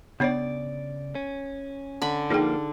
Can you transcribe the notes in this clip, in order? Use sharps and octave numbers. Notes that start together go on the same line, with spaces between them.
C#3 B3 D4 C#5 D5
C#4
D3 B5
F3 A#3 D#4 G#4 G5